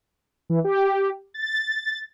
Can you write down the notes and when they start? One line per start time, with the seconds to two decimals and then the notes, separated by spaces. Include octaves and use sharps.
0.49 E3
0.64 G4
1.34 A6